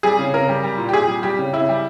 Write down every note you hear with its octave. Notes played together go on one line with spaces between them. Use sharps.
G3 G#4
C#3
C#3 A#4
G3
G3
A#2
G4
A#2 G#4
G3
G3 G4
C#3
C#3 E4
G3